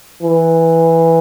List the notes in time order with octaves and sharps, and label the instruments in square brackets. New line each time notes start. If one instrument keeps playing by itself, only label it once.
[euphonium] E3